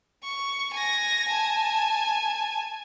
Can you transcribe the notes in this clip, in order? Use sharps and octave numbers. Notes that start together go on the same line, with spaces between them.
C#6
G#5 A#6
G#5 A5